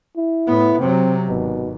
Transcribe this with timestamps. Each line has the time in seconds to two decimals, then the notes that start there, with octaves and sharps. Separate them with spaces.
0.17 E4
0.47 A2 B3
0.80 C3 F#3 C4
1.28 G#1 B2